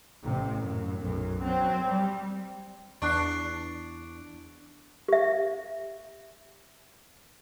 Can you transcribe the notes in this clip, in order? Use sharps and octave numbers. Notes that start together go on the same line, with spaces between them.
A1 C3
F#2
B1 F#2
F#3 C4
G3
E2 D4 C#6 F#6 C7
G4 E5